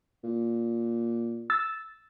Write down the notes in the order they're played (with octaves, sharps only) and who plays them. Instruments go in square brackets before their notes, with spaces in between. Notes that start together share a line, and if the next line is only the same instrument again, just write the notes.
[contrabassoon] A#2
[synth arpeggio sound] E6 A6